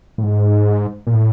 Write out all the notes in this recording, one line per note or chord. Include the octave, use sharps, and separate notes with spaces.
A2
G#2
A#2
A2